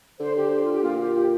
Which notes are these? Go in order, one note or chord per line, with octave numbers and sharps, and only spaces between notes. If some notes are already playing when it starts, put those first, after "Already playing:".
D3 C5
G4
G4
F4
G4
A#2 F4
G4
G4